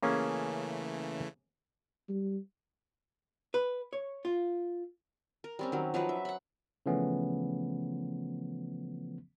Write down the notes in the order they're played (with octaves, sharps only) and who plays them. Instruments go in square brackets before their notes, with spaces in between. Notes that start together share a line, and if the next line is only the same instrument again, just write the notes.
[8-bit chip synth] C#3 E3 A3 [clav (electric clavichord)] A#3 C#4 G#4
[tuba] G3
[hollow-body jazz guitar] B4
C#5
F4
[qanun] A#4
G3 C4 C#4
D#3 F#3
F3 F#3 D#4 B4
E5
F#5 B5
[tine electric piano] C#3 E3 F3 A3 B3 C#4